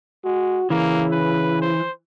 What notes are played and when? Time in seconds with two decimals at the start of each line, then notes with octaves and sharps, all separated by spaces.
0.25 G#3 F#4
0.70 C#3 E3 A#3
1.11 B4
1.62 C5